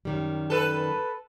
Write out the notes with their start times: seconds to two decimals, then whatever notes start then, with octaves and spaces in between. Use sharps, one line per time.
0.05 F#2 D#3 G3
0.50 A4 B4